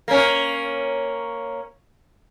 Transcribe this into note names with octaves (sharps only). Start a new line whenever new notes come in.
A#3 C#4